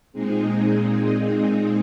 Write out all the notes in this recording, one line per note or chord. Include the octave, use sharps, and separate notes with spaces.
A#2 G#3 C4 D#4 G#4